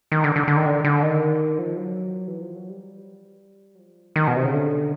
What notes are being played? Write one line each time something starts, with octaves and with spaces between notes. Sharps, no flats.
D#3
D3
D3
D3
D#3
D3
D3
D#3
F3
F#3
E3
F3
F#3
G3
F#3
F3
D#3
B2
C3
C#3
D3